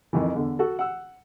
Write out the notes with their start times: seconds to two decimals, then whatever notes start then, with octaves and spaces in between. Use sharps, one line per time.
0.13 F2 D#3 E3
0.34 E2 D3
0.59 F#4 A4
0.79 F#5 E6